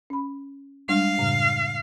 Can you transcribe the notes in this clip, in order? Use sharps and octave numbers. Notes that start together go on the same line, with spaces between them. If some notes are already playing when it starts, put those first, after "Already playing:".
C#4 B5
G3 G#3 D4 F5
F#2 A2 C#3